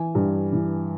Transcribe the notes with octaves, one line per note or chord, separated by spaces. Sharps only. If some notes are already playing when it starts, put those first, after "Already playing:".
Already playing: E3 G#5
G2
E3